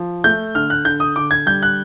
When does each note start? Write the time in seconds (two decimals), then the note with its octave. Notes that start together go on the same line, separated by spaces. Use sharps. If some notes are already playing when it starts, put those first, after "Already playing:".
Already playing: F3
0.24 A3 G6
0.55 D3 F6
0.70 F#6
0.85 D3 G6
1.00 D#6
1.16 D3 D6
1.31 G#6
1.46 G3 G6
1.63 F#6